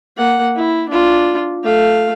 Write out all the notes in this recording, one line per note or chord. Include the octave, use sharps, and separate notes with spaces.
A#3 F#5
E4
D4 F4
A3 F5